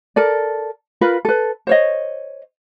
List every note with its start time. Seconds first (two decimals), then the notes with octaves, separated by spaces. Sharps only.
0.16 A4 A#4 D5
1.01 F4 A#4 B4 B5
1.25 A4 B4
1.67 C5 C#5 D#5